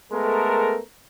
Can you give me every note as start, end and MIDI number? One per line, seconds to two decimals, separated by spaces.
0.12 0.79 56
0.12 0.79 57
0.12 0.79 59
0.12 0.79 69
0.12 0.79 70